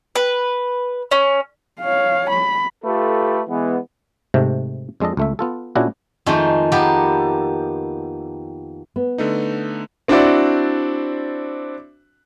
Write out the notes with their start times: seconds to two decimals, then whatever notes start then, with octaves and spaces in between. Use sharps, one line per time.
0.15 B4
1.11 C#4
1.81 C#5 F5
2.30 B5
2.84 A3 F4 G4 A4 B4
3.48 E3 G#3 B3
4.34 G#2 C3 A3
5.00 F2 G#3 D4 A4 D#5
5.17 C#2 A3 E5
5.39 B3 F4 A4
5.75 A#2 C#4 D4 E4 F#4 G#4
6.26 F2 D#3 G#3 A3
6.72 A#3 B3 G4 A4
8.96 B3
9.18 D3 A3 D#4
10.08 C4 D4 E4 F#4 C5 D5